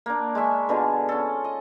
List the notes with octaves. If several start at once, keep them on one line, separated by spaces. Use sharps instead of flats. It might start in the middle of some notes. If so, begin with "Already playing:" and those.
A#3 D4
G#3 D4 E5 C#6
B2 D3 F4 G#4
C#4 A4
D#5